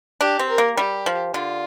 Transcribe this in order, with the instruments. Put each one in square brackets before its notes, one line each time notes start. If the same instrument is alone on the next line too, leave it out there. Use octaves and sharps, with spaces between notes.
[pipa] D4 [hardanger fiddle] G4
[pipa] C4
[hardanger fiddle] A#4
[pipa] A#3
[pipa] G3 [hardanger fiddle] G4
[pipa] F3
[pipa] D3 [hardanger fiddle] F4